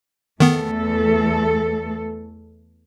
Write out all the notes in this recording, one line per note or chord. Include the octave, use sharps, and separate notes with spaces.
E2 D#3 A3 B3 A4